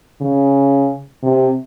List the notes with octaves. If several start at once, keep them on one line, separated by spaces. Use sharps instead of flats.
C#3
C3